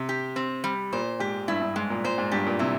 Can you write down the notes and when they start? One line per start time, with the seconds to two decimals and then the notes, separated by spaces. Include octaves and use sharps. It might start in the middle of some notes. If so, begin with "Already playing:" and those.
Already playing: C3
0.09 G4
0.36 C4
0.64 G3
0.92 A#2 C5
1.19 G#2 G4
1.48 G2 E4
1.61 G2
1.76 G#2 G#3
1.90 A#2
2.04 A#2 C5
2.18 G#2
2.32 G2 G4
2.46 A#2
2.59 C3 E4